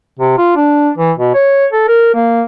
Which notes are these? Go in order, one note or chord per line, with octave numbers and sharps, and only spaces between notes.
C3
F4
D4
E3
B2
C#5
A4
A#4
A#3